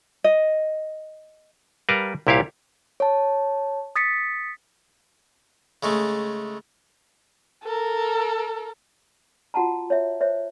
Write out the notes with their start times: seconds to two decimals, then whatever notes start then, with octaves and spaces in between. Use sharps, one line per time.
0.24 D#5
1.89 G3 A#4 B4 F5 A5 A#5
2.27 C2 A#2 E4 G4 C#5 F5
3.00 C#5 A5
3.96 D#6 A6 B6 C#7
5.83 C#3 G#3 A3
7.64 A4 A#4
9.54 F4 F#4 F#5 A5 A#5
9.90 C#5 E5
10.21 C5 C#5 E5